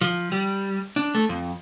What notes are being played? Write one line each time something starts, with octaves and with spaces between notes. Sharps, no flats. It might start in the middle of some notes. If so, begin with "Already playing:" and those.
F3
G3
D4
A3
F2